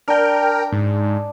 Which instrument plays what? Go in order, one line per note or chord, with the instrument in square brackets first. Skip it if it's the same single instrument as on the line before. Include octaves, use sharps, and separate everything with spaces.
[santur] D4 [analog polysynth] A#4 G5
[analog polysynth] G#2